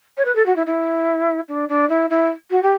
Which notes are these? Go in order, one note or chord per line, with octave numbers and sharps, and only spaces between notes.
C#5
B4
A4
F#4
E4
E4
D4
D4
E4
E4
F#4
G4